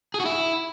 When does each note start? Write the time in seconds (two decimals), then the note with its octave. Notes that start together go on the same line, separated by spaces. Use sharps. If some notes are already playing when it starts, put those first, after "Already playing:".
0.14 G#4
0.20 F#4
0.26 E4